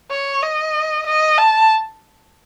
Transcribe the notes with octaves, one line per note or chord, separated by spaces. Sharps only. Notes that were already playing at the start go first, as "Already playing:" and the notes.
C#5
D#5
D#5
A5